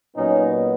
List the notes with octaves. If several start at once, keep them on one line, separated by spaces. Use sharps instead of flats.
A#2 F#3 B3 C#4 D#4